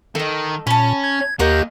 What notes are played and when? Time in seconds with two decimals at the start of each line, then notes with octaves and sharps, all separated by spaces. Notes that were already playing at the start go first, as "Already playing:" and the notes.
0.15 D#3 A4 D#5
0.67 A#2 C#4 A5 B5
1.04 G#6
1.39 D#2 A#3 G4 A#4 C#5 D#5 F#5 G6